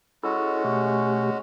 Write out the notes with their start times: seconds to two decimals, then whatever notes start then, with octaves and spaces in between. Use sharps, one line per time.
0.24 G#3 C#4 E4 F#4 A4
0.64 B2 A3 G4